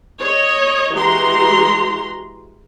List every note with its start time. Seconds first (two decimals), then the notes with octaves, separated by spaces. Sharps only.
0.19 C#5 D#5
0.92 E3 G#3 F#4 G4 A#5 C6